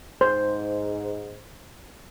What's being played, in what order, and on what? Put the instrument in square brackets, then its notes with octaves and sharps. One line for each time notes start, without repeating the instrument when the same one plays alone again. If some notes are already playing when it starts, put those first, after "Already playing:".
[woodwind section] G#2 [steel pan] C5